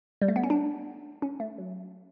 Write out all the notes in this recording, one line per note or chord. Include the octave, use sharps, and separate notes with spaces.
G3
A3
B3
C#4
D4
C#4
A3
F#3